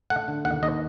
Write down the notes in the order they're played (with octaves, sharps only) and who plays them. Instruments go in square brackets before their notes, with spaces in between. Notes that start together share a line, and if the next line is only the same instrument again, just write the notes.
[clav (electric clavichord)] A3 F#5
D3
D#2 F#5
D#2 D#5